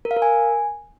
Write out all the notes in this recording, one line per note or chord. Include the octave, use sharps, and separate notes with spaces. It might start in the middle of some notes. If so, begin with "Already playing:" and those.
A#4
F5
A#4
G#5